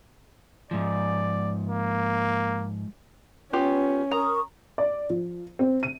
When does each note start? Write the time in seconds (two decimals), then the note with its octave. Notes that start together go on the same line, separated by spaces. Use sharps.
0.71 G#2 F3 D5
1.69 A#3
3.53 B3 C#4 F4 G4
4.11 A#4 A#5 C#6 D#6
4.78 D5
5.10 F3
5.59 C4
5.83 D#7